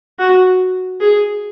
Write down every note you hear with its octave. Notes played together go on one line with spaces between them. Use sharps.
F#4
G#4